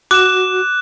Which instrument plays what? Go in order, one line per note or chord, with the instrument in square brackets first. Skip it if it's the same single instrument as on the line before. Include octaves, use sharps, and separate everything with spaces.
[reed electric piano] F#4 [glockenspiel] D6 [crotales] F#6 E7